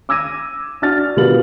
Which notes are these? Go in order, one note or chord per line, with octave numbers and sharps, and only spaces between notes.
D6 E6 G#6 A#6 D#7
D4 F#4 F6 A6
B2 G3 F4 B4 F#7